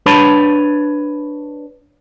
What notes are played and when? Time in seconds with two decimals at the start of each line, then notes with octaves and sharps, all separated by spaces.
0.06 D4 B4 C#5 A5 B5